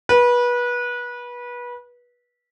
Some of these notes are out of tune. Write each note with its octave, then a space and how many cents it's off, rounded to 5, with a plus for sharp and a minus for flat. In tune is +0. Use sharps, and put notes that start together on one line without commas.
B4 -25